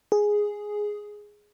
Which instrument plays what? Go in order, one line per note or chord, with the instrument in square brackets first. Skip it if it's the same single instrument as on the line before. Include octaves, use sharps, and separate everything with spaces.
[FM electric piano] G#4